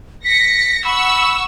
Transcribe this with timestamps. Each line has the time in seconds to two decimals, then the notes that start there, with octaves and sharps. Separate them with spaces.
0.25 A#6 B6 C#7
0.85 F#5 B5 C#6 E6